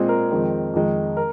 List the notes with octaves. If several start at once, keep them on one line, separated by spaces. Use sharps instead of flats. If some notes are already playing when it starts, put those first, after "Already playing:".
Already playing: A#2 G#3 C4 G#4
A#4
F2 D#3 G#3 C4
F2 D#3 G#3
A#4